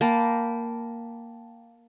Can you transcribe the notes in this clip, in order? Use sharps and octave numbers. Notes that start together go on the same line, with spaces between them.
A#3 G5 A5 B5